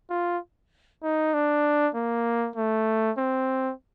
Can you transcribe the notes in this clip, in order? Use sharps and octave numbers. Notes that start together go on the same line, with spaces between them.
F4
D#4
D4
A#3
A3
C4